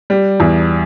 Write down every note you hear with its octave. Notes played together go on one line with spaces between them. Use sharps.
G3
E2